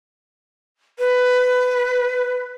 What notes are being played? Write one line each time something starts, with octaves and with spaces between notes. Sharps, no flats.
B4